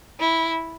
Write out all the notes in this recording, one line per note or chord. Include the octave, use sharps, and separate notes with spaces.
E4